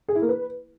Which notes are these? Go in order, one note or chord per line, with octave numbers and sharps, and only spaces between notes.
G#4
E4
A#3
B4